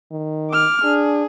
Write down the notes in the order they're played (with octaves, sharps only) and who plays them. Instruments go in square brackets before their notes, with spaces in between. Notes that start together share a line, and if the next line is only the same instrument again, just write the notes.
[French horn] D#3
[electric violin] D6 F6
[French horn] D4 [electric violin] G#4